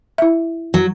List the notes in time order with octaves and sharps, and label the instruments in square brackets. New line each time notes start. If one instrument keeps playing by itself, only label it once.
[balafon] E4 E5
[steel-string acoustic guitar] F#3